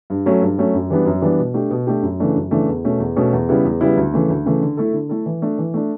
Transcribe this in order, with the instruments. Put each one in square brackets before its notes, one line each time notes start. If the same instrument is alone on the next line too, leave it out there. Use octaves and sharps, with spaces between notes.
[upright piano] G2
F#3 A3 C#4
G2
F#3 A3 C#4
F#2
E3 G3 B3 D4
F#2
E3 G3 B3 D4
B2
A3 D4 G4
B2
A3 D4 G4
F#2
C#3 E3 A3 D4
F#2
C#3 E3 A3 D4
E2
B2 A3 C#4
E2
B2 A3 C#4
E2
C#3 G3 B3 E4
E2
C#3 G3 B3 E4
D2
C#3 E3 A3
D2
C#3 E3 A3
D3
A3 E4 A4
D3
A3 E4 A4
E3
A3 D4
E3
A3 D4